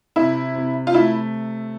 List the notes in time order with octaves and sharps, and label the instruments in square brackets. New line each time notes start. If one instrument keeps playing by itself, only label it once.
[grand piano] C3 [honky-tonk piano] E4
[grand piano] C3
[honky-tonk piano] F4
[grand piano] A3 [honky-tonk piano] E4